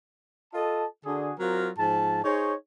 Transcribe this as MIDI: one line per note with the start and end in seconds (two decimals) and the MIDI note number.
0.54 0.85 65
0.54 0.85 69
0.54 0.85 75
0.54 0.85 81
1.05 1.32 50
1.05 1.32 62
1.05 1.32 66
1.05 1.32 68
1.39 1.69 54
1.39 1.69 60
1.39 1.69 65
1.39 1.69 70
1.78 2.22 44
1.78 2.22 53
1.78 2.22 81
2.24 2.53 63
2.24 2.53 68
2.24 2.53 72
2.24 2.53 73